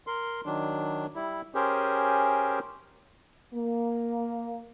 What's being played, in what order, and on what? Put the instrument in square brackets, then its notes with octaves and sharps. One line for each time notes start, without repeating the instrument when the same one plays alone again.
[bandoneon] A#4 C6
D#3 F#3 D4
G3 E4
C#4 G4 G#4 A#4 C5
[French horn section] A#3